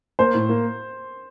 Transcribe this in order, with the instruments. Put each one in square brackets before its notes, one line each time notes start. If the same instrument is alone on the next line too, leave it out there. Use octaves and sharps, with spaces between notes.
[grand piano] A#3 [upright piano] C5
[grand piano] A2
A#3